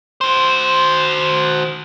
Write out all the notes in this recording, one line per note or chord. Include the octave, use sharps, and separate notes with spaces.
F#4 C5